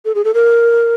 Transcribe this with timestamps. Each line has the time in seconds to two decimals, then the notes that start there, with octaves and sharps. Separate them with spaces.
0.05 A4
0.15 G#4
0.25 A4
0.34 A#4